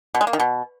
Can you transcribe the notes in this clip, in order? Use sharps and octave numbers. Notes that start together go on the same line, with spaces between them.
B2
G#3
A#3
D#3
B2